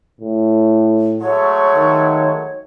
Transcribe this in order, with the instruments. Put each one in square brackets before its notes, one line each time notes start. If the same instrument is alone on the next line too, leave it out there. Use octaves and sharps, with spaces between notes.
[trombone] A2
[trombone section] F#3 G#3 A3 [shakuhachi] C#5
[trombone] D#3